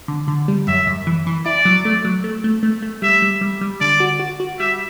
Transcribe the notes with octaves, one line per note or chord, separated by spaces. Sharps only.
D3
D3
G3
F#2 E5
F#2
E3
E3
E4 D5
F#3
A3
F#3
A3
A3
A3
A3
G3 E5
G3
G3
G3
D3 D5
F#4
F#4
F#4
G3 E5